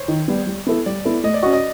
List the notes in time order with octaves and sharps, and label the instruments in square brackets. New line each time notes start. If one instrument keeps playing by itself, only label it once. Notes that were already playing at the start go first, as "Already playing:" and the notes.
Already playing: [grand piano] C5 C#5
[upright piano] D#3
G3 B3
G3
B3 E4 A4
[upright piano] G3 [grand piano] D5
[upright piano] B3 E4 A4
[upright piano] A3 [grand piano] D#5
[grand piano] D5
[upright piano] F#4 [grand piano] D#5
[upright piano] C#4
[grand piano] D#5